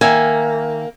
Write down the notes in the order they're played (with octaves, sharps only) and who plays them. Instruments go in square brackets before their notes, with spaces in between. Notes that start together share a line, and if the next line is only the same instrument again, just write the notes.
[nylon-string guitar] D#3 E5 G#5 [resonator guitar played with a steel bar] A#3